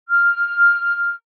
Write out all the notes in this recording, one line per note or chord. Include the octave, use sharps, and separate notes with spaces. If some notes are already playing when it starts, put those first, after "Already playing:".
F6